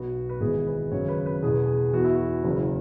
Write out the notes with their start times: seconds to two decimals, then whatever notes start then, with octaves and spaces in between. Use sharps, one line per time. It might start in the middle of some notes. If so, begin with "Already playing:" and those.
Already playing: B1 B2 B3 F#4
0.29 B4
0.40 G#1 G#2 E3 B3 G#4
0.67 B4
0.92 G#1 F#2 C#3 F#3 C#5
1.08 B4
1.26 B4
1.42 E2 B2 B3 G#4
1.54 B4
1.66 G#4
1.93 E2 E3 B3 F#4
2.04 E4
2.15 F#4
2.44 F#1 E2 C#3